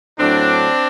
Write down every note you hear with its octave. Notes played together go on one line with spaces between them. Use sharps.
A2 F#3 C4 D4